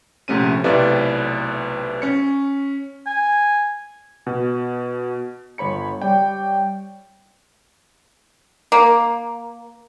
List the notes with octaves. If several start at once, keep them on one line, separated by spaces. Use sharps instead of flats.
A#1 C3 A3 C#4 D#7
B1 A2 C3 B4 D5 E5
C#4 C#7
G#5
B2
G1 C#5 B5 C#7
G3 C#5 D5 G5
A#3